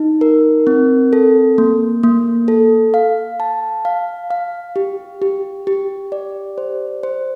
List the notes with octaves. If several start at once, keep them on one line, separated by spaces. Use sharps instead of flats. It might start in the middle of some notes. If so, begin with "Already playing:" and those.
Already playing: D#4
A#4
C4
A4
A#3
A#3
A4
F5
A5
F5
F5
G4
G4
G4
D5
C5
C5